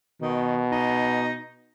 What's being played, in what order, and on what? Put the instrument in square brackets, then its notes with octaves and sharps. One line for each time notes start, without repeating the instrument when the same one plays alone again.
[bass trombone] B2 [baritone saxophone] D#3
[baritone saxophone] D#4